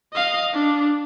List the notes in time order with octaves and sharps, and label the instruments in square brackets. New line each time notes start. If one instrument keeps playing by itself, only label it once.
[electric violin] D#5 F5
D4